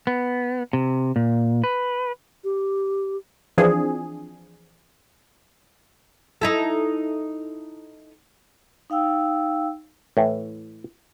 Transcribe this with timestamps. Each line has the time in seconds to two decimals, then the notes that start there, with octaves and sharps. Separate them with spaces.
0.07 B3
0.73 C3
1.16 A#2
1.64 B4
2.44 G4
3.58 E3 F3 C4 D4 G#4
6.41 D#4 E4 A4
8.90 D#4 F5 G5 E6
10.17 A2 E3